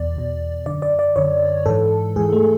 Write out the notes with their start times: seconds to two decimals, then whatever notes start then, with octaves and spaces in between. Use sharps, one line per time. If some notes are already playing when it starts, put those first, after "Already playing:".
Already playing: E2 B2 D5
0.16 E2 B2
0.66 F#2 D3 D5
0.82 D5
0.99 D5
1.16 F#2 D3 C#5
1.66 G#2 E3 A4
2.16 G#2 E3 G#4
2.33 A3